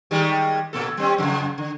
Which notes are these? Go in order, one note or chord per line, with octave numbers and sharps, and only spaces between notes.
D#3 G3 G#3
A#2 A#3 A4
G3 C4 C#4
F2 C#3
D3